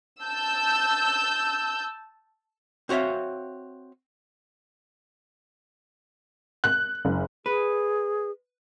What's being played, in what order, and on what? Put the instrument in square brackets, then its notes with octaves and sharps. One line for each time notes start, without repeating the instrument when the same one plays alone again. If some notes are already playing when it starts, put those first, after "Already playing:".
[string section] A5 E6 G6
[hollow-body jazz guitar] C4 F#4 C#5 E5 F5
[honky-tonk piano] F#6
F#1
[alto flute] G#4 [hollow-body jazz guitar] B4